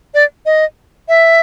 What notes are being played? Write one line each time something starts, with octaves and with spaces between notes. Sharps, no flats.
D5
D#5
E5